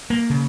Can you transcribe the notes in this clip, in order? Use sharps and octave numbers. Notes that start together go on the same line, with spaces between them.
A#3
C#3